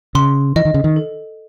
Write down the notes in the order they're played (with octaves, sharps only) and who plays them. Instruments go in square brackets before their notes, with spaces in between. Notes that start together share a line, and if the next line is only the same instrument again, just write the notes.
[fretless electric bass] C#3 [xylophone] C6
[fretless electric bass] E3 [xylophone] D#5
[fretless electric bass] D#3
C#3
D#3
[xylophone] A4